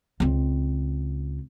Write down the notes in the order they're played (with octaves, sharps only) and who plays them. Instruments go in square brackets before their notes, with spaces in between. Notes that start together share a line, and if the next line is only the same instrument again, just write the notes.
[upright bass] C#2 C4